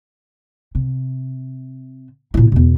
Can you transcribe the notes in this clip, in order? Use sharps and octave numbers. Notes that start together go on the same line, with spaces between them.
C3
A#2 E4
E2 B2